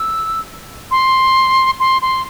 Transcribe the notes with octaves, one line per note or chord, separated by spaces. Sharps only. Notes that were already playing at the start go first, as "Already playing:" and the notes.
Already playing: E6
C6
C6
C6